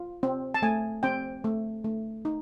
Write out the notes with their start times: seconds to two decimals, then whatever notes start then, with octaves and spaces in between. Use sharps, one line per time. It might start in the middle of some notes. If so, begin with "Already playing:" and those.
Already playing: F4
0.23 C4
0.54 A5
0.62 A3 G#5
1.03 C4 G5
1.44 A3
1.84 A3
2.25 D#4